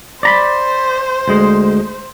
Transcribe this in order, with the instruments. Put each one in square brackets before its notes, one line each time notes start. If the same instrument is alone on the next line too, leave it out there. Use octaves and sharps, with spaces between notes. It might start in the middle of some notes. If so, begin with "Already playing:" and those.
[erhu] C5 [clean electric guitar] D5 A#5 B5
[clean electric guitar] D2 G#3